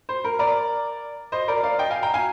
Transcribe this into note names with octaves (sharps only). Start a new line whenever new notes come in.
C5
A#4
A#4 D5
C5 D#5
A#4 D5
D5 F5
D#5 G5
F5 G#5
G5 A#5
F5 G#5